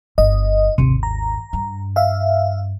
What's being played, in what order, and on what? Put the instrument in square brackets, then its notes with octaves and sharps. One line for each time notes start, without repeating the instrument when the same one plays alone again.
[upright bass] G1 [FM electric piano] D#5
[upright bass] G#1 D#2 [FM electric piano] C3
[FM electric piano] A#5
[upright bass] G2
[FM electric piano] E5 F5